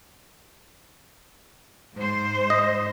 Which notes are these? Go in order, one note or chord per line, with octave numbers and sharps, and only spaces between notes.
G#2 C5
D#5